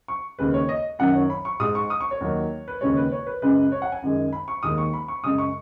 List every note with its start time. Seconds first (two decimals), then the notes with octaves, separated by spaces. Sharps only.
0.08 C#6
0.39 D#2 C#3 G#3 B4
0.54 C#5
0.69 D#5
0.99 F#2 D#3 F#3 F#5
1.15 C#5
1.30 B5
1.45 C#6
1.60 G#2 G#3 D#6
1.75 C#6
1.90 D#6
2.01 C#6
2.11 C#5
2.20 D#2 D#3 F#3
2.68 B4
2.81 D#2 C#3 G#3 C#5
2.97 B4
3.12 C#5
3.27 B4
3.42 F#2 C#3 G#3 B4
3.72 C#5
3.82 F#5
3.92 G#5
4.02 F#2 D#3 G#3
4.33 B5
4.48 C#6
4.63 D#2 D#3 G#3 D#6
4.78 C#6
4.93 B5
5.08 C#6
5.23 F#2 C#3 G#3 D#6
5.38 C#6